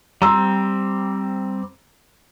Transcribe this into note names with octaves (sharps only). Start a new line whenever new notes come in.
G3 C4 A#5 C6 E6